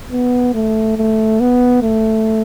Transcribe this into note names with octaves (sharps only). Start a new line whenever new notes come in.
B3
A3
A3
B3
A3